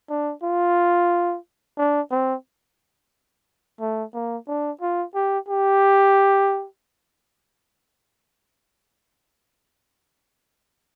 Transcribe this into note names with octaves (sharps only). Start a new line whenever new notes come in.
D4
F4
D4
C4
A3
A#3
D4
F4
G4
G4